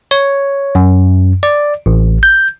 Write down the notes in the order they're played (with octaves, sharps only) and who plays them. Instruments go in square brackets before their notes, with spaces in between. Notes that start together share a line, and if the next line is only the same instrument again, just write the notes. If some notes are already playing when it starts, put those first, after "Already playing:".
[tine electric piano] C#5
F#2
D5
A1
G6